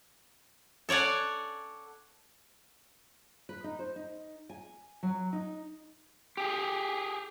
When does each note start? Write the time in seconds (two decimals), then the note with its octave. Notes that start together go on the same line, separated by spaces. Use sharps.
0.89 A4 C#5 D5 F#5 G#5
3.49 B4
3.64 D#4
3.79 C5
3.96 D#4
4.49 G#5
5.03 F#3
5.33 D#4
6.37 G4 G#4